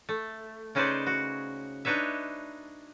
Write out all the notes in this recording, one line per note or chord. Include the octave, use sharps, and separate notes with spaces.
A3
C#3 C#4 D#4 B4 C5 D5
F#4
D4 D#4 B4 C#5 E5